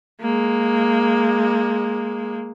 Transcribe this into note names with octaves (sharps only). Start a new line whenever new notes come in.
G#3 A#3